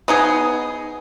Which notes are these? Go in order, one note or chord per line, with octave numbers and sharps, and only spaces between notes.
B3 D#4 G#4